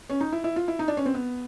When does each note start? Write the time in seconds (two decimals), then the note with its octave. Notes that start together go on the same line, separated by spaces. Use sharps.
0.10 C#4
0.21 D#4
0.32 E4
0.44 E4
0.56 F4
0.68 E4
0.79 D#4
0.88 D4
0.97 C#4
1.06 C4
1.14 B3